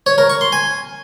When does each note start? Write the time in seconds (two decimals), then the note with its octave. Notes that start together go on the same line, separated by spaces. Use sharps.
0.06 C#5
0.18 A#4
0.29 C#6
0.41 C6
0.52 G#5